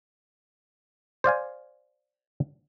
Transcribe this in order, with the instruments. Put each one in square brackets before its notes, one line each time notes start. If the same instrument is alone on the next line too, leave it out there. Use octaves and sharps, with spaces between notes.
[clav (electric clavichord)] C5 D5 F5 G#5